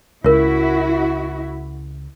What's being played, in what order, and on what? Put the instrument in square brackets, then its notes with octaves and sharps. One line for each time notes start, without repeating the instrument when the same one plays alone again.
[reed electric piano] C#2 C#3 [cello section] E4 F#4 [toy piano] A#4 C#5